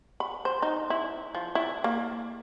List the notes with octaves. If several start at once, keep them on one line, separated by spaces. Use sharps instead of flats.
B5
C5
D#4
E4
F3
E4
A#3